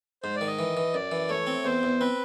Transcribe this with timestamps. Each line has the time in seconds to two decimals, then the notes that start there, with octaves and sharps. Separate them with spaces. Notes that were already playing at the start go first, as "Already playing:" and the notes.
0.23 G#2 C5
0.36 D5
0.41 D#3
0.47 D#5
0.59 E3
0.77 E3
0.94 F#2 D5
1.11 E3
1.29 A3 C#5
1.47 C4
1.65 E2 C5
1.83 E2
2.00 C4 B4